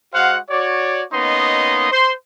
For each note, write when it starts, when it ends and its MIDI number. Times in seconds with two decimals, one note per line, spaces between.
0.14 0.38 56
0.14 0.38 66
0.14 0.38 72
0.14 0.38 77
0.14 0.38 78
0.50 1.03 66
0.50 1.03 73
0.50 1.03 74
1.13 1.89 58
1.13 1.89 59
1.13 1.89 61
1.13 1.89 63
1.13 1.89 75
1.13 1.89 84
1.92 2.13 72
1.92 2.13 84